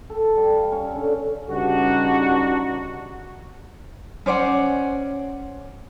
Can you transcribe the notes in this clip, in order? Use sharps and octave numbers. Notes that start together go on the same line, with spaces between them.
A4
G3
F5
C#4
D3
G2 C#3 G3 D4 D#4 F#4
C#4 C5 D5 F#5